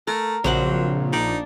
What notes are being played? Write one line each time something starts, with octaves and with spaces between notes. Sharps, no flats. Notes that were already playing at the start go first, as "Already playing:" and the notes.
A3 A#4
A#1 C#3 F#3 A#3 C4 C5 C#5 F#5
D4 D#4 D5